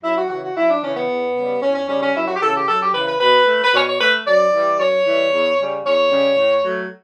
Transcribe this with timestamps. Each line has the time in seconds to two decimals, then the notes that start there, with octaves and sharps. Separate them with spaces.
0.04 F#2 E4
0.16 F#4
0.29 C#3 E3 F#4
0.42 F#4
0.56 F#2 E4
0.69 D4
0.83 C#3 E3 C#4
0.96 B3
1.10 E2
1.36 C#3 G3
1.61 E2 C#4
1.75 C#4
1.89 C#3 G3 C#4
2.02 C#4
2.15 F#2 E4
2.28 F#4
2.36 G4
2.41 C#3 E3 A4
2.55 G4
2.67 F#2 A4
2.81 G4
2.94 C#3 E3 B4
3.08 B4
3.20 B2 B4
3.47 A3
3.64 B4
3.74 B2 C#5
3.87 C#5
4.00 A3 B4
4.27 F#2 D5
4.53 E3 G3
4.79 F#2 C#5
5.07 E3 G3
5.33 E2
5.60 C#3 G3
5.86 E2 C#5
6.12 C#3 G3
6.38 A2
6.65 F#3 A3